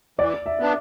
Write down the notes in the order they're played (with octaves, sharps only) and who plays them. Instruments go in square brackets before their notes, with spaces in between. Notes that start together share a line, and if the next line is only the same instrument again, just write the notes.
[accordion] E3 [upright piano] D5
[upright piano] E5
[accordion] B3 D4